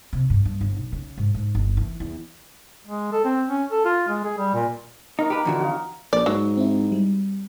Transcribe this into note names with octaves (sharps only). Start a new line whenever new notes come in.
C3
G2
G2
G1
B1
C#3
G#2
G#2
G1
E3
E2
G#3
A4
C4
C#4
A4
F4
G#3
G#4
G3
A#2
D#4 E4 A#4 C#6
A#3 D#4 G4 B4
F2 D3 E3 F#4
F#4 D#5 F5
A#1 D5
G#2 F#3
C4 E4
G3